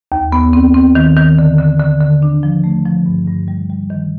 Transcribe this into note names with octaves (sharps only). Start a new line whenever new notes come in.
D#2
B3
C4
C4
D#3
D#3
D3
D3
D3
D3
D4
F3
A3
F3
G2
G2
G3
G3
D#3